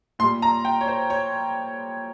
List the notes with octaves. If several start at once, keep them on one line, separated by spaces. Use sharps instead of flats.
A#2 G3 C6
A#5
G5
C#5
C5
C#5